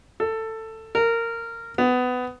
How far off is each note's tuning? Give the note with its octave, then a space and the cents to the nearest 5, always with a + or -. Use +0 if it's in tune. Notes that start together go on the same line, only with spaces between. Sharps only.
A4 +15
A#4 -15
B3 +20